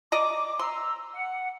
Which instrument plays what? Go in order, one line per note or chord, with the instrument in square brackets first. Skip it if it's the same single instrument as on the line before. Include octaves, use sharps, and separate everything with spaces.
[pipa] D5 D#5 A#5 [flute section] D6
[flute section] A#5 E6 [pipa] C6
[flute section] F#5